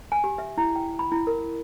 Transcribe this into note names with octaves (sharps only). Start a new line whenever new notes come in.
G#5
G4
E5
E4
G5
B5
E4
A#4